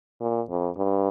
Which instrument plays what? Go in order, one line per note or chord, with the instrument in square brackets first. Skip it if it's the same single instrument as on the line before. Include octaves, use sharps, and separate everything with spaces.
[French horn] A#2
F2
G2